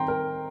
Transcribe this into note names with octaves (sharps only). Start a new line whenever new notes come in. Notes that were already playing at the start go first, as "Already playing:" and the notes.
Already playing: D#3 C4 G5 A#5 C6
A#4